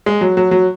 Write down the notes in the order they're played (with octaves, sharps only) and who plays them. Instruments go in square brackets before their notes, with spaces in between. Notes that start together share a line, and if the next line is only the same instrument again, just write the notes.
[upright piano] G#3
F#3
F#3
F#3